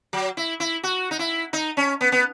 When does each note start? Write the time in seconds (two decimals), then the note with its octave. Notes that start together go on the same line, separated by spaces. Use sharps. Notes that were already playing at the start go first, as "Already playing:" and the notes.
0.13 F#3
0.37 E4
0.60 E4
0.83 F#4
1.11 D#4
1.19 E4
1.53 D#4
1.77 C#4
2.01 B3
2.12 B3